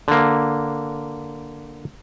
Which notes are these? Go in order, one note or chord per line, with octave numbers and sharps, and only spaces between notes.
D3 A#3